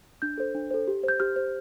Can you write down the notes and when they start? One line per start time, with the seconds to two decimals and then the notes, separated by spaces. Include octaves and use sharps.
0.22 D4 G6
0.38 A4 C5
0.55 D4
0.71 A4 C5
0.87 G4
1.03 C5 G6
1.20 G4 F6
1.36 C5